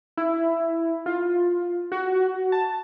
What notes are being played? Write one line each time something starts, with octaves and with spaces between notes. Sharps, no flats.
E4
F4
F#4
A5